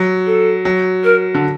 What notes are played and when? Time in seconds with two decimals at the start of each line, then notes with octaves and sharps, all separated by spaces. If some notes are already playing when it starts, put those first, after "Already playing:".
Already playing: F#3
0.26 A4
0.65 F#3
1.04 A#4
1.34 D3